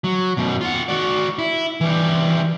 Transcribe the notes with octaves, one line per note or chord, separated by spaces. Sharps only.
F#3
F#2 B2
F4 F#5
F#4 D5
E4
E3 G3